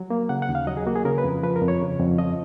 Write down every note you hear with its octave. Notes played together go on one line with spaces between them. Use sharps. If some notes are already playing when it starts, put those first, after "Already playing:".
Already playing: F#3
A#3
C#3 F#5
F#5
D#2
F5
F#3 D#5
G#4
A#3 F#4
G#4
C#3 A#4
B4
F2
F3 B4
A#4
F2
C#5
C#3
F2
F3 D#5